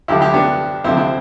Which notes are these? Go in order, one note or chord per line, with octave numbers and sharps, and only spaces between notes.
D2 D3 F3 E4 G4
E4 G4
B3 D4
D2 D3 F3 C4 E4
C4 E4